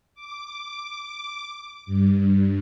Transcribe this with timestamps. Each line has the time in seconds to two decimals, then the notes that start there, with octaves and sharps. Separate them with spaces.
0.15 D6
1.86 G2